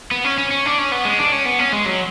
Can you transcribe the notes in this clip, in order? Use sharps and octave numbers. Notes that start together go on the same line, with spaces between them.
B3
C#4
C#4
C#4
D4
C#4
B3
G#3
D4
C#4
B3
C#4
G#3
F#3